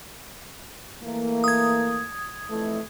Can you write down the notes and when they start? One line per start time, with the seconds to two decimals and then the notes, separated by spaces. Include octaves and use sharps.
1.03 E3 A3 A#3
1.44 D#6 G#6
2.50 F2 E3 A3